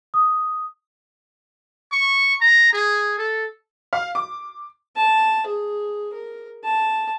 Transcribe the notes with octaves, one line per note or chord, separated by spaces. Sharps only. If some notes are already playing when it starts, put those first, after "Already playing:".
D#6
C#6
A#5
G#4
A4
F5
D6
A5
G#4
A#4
A5